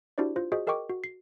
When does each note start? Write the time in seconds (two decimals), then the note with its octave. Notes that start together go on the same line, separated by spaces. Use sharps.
0.18 D4 E4 F#4 G4 C5 D5
0.36 F4 C5
0.52 F#4 G#4 C5 D#5
0.67 G#4 A#4 D#5 G5 C#6 D6
0.89 F#4
1.04 C7